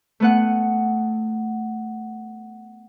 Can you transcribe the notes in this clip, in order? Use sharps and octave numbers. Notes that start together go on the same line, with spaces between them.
A3 B3 F#5